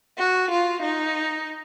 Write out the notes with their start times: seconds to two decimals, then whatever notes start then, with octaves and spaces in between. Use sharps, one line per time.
0.19 F#4
0.51 F4
0.83 D#4